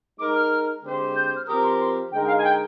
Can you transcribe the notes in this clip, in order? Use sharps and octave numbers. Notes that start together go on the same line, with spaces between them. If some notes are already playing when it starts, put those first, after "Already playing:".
G#3 D#4 A#4 D6
F6
D3 G#3 C4 G4 C5
G6
G6
F6
F3 C4 G4 A#4 D#6
C6
C6
D3 G#3 D#4 A#4 G5
G5
F5
G#5
G5